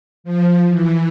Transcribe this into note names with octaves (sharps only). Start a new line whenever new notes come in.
F3
E3